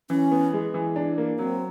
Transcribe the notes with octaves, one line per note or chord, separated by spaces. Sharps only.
E3 C#4
B3
G#3
E3
D4
A#3
F#3 C4